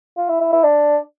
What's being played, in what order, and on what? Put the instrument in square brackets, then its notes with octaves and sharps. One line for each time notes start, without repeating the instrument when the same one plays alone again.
[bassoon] F4
E4
E4
E4
D4